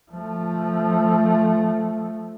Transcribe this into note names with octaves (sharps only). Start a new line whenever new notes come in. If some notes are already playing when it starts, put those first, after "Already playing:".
F3 A3